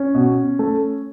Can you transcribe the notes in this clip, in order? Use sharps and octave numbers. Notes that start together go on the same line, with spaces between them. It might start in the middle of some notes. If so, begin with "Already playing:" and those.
Already playing: C#4
B2
A3